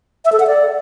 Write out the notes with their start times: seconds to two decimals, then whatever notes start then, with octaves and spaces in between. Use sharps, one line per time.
0.25 E5
0.32 A4
0.40 F#5
0.47 D5